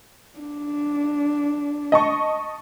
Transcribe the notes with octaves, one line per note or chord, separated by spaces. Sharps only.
D4
D#5 A5 C#6